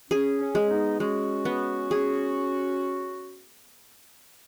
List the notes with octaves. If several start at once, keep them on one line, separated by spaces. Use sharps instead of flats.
C#4 G#4
C#4
G#3
B3 D#4
G#3 C#4 F#4
B3
G#4